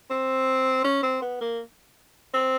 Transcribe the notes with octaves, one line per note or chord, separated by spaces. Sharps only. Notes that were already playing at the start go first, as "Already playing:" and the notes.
C4
C#4
C4
B3
A#3
C4